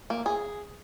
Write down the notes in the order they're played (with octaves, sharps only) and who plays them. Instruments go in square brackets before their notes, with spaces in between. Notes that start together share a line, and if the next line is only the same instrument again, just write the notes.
[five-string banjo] A#3
G#4